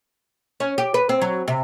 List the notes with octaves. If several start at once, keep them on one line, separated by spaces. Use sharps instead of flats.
C#4
G4
B4
C4
F#3
C3